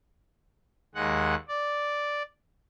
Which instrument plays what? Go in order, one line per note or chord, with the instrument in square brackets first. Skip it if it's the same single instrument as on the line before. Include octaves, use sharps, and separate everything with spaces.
[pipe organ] D#2 G#3 F#5
D5